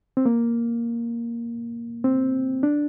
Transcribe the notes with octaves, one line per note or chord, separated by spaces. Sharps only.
C4
A#3
C4
D4